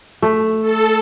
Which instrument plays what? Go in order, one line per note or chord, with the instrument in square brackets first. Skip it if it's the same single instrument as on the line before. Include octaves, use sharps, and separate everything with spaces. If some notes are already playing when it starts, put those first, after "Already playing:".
[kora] A3
[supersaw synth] A4